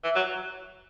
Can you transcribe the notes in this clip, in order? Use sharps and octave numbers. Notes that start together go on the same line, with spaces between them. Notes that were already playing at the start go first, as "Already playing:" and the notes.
E3
F#3